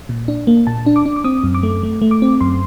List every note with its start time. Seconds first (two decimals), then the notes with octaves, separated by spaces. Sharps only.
0.09 A#2
0.28 D4
0.47 A#3
0.67 A#2 A5
0.86 D4
0.96 D6
1.06 D4
1.16 D6
1.24 C4 D#6
1.44 F#2
1.55 D6
1.63 A3
1.83 A3
2.02 A3
2.11 D6
2.22 C4
2.41 F#2 C6